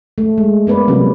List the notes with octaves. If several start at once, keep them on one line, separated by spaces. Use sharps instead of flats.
A3
G#3
A#3 B3 B4 D5
C3 F#3 G3 C#4